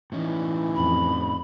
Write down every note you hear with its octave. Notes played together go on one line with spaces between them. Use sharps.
A2 E3 C#4 D#4
F2 B5